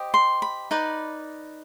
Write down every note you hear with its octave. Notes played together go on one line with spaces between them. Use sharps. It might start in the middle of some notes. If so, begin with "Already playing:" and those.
Already playing: G4 C5 D#5
C6
B5
D#4 B4 D5